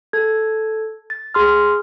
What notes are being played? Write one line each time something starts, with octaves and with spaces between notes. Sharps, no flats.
A4 G#6
A6
G#4 C6 F6